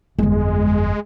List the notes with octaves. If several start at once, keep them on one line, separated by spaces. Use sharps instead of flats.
G1 F2 G#3